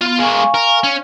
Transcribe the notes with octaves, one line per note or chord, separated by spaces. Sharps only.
B3 F4 F5
G#3 A#3 F5 G#5 C#6
A#4
C#4